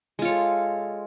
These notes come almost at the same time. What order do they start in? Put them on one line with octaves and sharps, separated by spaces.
G#3 F4 C#5 A4